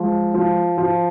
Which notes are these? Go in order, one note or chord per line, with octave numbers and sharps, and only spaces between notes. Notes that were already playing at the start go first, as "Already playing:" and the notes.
Already playing: F3 G#3
F3
F3